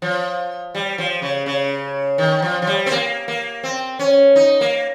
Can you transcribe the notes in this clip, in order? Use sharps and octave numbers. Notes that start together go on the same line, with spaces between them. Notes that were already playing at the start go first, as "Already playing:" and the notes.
F3
G3
F3
C#3
C#3
D#3
F3
F3
G3
C4
A#3
A#3
C4
C#4
D#4
A#3